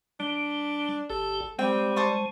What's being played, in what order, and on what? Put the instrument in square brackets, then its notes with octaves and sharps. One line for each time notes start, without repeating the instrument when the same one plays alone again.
[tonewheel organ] G3 [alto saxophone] D4
[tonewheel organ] G1 G4 [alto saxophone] A4
[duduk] G3 [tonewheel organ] G#3 [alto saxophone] C4 [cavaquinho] G5
[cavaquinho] C5 A5 C#6